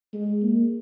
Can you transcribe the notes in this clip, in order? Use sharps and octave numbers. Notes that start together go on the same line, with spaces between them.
G#3
A#3